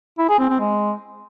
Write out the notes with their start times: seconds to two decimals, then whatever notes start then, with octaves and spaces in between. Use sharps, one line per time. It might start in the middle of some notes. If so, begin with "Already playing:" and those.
0.18 E4
0.29 G#4
0.39 C4
0.50 C4
0.60 G#3